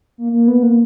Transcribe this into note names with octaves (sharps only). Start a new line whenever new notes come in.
A#3
A#3
B3
A#3